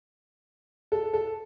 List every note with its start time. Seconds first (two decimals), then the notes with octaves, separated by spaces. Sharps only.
0.92 A4
1.13 A4